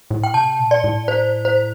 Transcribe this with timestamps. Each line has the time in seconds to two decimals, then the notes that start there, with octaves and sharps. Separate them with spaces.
0.11 A2
0.24 G5
0.34 C3 A5
0.59 A#2
0.71 D5
0.84 A2
1.08 C5
1.45 C5